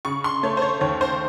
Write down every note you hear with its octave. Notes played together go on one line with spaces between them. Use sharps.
C#3 C#6
C6
A3 C#5
C5
C#5
D#2 C#5
C5